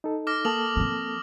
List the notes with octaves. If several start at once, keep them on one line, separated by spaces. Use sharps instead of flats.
D#4 A4
D6 F6 A#6
A#3 A4 A5 D#6 F#7
F3 C4